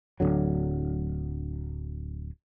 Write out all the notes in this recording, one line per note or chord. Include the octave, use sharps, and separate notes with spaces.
D1 B1 D3 F#3